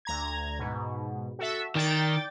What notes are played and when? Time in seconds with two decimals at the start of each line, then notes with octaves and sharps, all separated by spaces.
0.05 D2 A#5 G#6
0.59 G#2 B2
1.39 F#4 A4 E5
1.75 D#3 D5 G5 A6